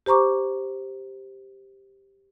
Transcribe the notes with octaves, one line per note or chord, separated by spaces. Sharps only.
G4 C5 A#5 C#6 D6